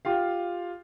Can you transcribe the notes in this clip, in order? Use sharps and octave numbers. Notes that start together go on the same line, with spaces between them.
F4 G4 F5